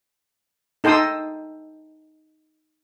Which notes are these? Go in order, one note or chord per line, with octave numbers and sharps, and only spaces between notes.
D#4 A4 G5 C6 D#6 E6